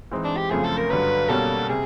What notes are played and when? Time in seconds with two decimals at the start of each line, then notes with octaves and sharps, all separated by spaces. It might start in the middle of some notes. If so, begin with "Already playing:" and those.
0.11 E3 G#3 C4 D#4
0.24 D4
0.37 G4
0.50 F#2 C#3 F3 A3 C4 G#4
0.64 A4
0.77 A#4
0.90 G2 D3 F#3 B4
1.29 B2 G3 A#3 C#4 A4
1.69 C3 G#4